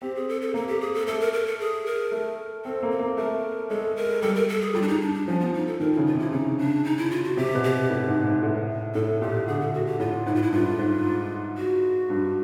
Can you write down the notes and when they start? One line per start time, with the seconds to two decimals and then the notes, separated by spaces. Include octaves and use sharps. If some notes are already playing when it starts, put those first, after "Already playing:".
0.02 C4 G4
0.16 G#4
0.29 A4
0.42 A4
0.54 A#3 A4
0.68 G4
0.81 G#4
0.94 A4
1.07 A3 A4
1.20 A#4
1.33 A#4
1.47 A4
1.60 G#4
1.86 A#4
2.12 A3
2.65 C4 A4
2.83 A#3
2.91 A4
2.99 A#3
3.17 A3 A#4
3.70 G#3 A4
3.96 A#4
4.22 G3 A4
4.35 A#4
4.49 A4
4.61 G#4
4.74 G3 F4
4.82 D4
4.88 D#4
5.01 D4
5.14 D4
5.27 F3 C#4
5.40 B3
5.54 D#4
5.67 A4
5.80 D#3 A#4
5.93 C#3 E4
6.06 F4
6.15 C3 E4
6.32 C#3 D#4
6.58 C#3 D4
6.85 D#4
6.98 E4
7.11 F4
7.24 F#4
7.37 C3 G4
7.55 B2
7.64 G4
7.90 A2
8.07 G#2
8.25 G#2
8.43 A2
8.95 A2 A4
9.21 A#2 G4
9.47 D3 G#4
9.60 A4
9.73 F#4
9.86 G4
9.99 A2 F4
10.26 G#2 E4
10.34 F4
10.42 E4
10.52 G2 F4
10.79 G#2
11.58 F#4
12.10 G2